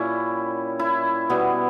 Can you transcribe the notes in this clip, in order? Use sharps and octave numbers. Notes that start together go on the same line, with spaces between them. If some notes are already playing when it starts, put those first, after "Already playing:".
Already playing: A#2 G3 C#4 E4
E4
B2 G3 B3